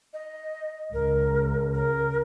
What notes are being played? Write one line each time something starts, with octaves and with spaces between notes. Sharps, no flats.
D#5
C#2 A#4
A#4